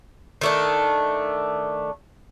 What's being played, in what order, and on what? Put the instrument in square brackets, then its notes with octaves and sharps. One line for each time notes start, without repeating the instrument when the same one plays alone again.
[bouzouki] D#3 A3 D4